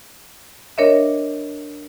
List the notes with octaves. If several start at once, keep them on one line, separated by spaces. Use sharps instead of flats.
D4 A#4 C#5 D#5 E5